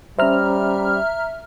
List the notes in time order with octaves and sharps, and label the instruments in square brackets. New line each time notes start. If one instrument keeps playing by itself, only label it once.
[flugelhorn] G3 [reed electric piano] C#4 C5 [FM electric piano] E5 A#5 F6